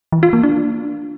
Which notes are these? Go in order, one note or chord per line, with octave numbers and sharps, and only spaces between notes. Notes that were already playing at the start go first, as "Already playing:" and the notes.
E3
F4
A#3
D4